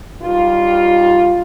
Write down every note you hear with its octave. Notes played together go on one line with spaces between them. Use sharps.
G2 D#3 G3 F4